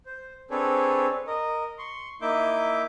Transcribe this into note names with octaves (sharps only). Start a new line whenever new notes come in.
C5
C4 D4 G#4 A4 B4 C#5
A#4 D#5
C6 C#6
A#3 D#4 E4 E5 D6 G6